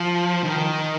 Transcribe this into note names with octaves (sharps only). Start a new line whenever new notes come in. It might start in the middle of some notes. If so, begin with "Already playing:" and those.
Already playing: F3
D#3